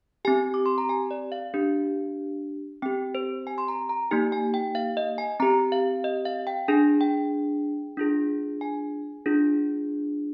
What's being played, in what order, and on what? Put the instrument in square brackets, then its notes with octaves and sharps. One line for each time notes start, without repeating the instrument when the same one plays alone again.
[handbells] C4 G4 G#5
D6
C6
A#5
G#5
D5
F5
D4 G4
C4 G4 G5
C5
G#5
C6
A#5
A#5
A#3 D#4 G4 G#5
G#5
G5
F5
D#5
G#5
C4 G4 A#5
F5
D#5
F5
G5
D4 G#4 G#5
G5
D4 F4 G#4
G#5
D4 F4 G#4